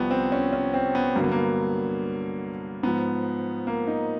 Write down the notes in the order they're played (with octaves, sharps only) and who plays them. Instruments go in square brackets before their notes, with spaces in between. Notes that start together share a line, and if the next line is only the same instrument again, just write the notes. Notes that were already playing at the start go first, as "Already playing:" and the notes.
Already playing: [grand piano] C2 C3 F3 B3
C4
C#4
C#4
C4
B3
G2 D3 F#3 A#3
B3
A#3
G#2 F3 B3
A#3
D#4